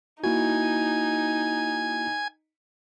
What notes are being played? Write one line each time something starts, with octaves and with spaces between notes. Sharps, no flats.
A#3 D#4 E4 F#4 G#5